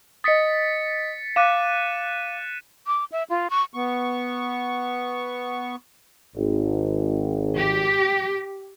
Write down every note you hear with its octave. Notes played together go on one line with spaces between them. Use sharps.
D#5 D#6 A6 B6 C#7
F5 D6 F#6 D#7 E7
D6
E5
F4
C#6
B3 C#6
G#1
G4